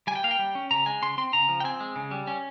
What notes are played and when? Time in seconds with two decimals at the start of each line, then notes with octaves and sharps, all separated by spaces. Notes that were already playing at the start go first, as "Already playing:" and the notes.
0.07 G3 G#5
0.16 G5
0.24 A#3 F5
0.31 G5
0.39 G3
0.55 C#4
0.71 C#3 A#5
0.86 G#3 G#5
1.02 C#3 C6
1.18 C4 C6
1.33 C#3 A#5
1.49 F3
1.60 G5
1.64 C4 G#5
1.80 G#3
1.96 C#3
2.11 G3
2.27 C#4